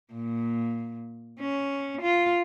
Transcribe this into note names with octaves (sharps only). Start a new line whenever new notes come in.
A#2
C#4
F4